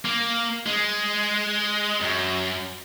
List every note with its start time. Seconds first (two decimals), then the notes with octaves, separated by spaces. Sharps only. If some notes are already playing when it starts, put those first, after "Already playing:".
0.05 A#3
0.67 G#3
2.01 F#2